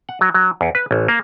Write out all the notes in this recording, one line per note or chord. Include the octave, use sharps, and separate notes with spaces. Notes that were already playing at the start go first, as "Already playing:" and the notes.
F#5
F#3
F#3
E2
B4
A1
A#3